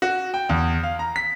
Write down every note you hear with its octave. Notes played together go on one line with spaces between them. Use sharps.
F#4
G5
E2
F5
A#5
B6